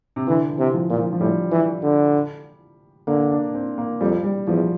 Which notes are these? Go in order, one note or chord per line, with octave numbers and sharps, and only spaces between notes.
C3
D3 E3
E3
C3
F3
A#2
F3
F3
A2 G3
E3
D3
D3 A#3
D4
C4
A#3
F2 G3
G3
E2 F3